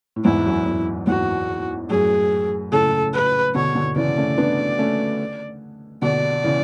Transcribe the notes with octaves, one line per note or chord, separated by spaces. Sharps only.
A2
E2 G#2 E4
F#2
E2
E2 G#2 F#4
F#2 A2 G#4
A2 C#3 A4
B4
B2 D3 C#5
B2 D3
C#3 E3 D5
A3 C#4
B3 D4
A3 C#4
B2 D3 D5
C#3 E3